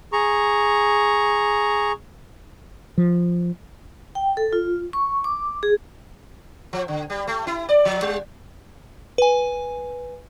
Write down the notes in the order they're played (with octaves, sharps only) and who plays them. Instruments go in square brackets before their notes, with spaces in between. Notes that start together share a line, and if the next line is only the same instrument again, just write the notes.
[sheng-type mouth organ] G#4 A#5 C#6
[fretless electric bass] F3
[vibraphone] G5
A4
F4
C#6
D6
G#4
[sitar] F3
D3
G3
A3
E4
D5
F3
G3
[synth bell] B4 G#5